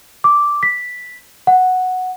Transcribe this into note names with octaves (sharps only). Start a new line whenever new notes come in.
D6
B6
F#5